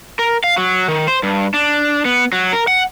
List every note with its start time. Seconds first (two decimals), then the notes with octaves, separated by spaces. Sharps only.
0.19 A#4
0.44 F5
0.57 F#3
0.88 D#3
1.08 C5
1.23 G2
1.54 D4
2.05 B3
2.32 F#3
2.53 A#4
2.68 F#5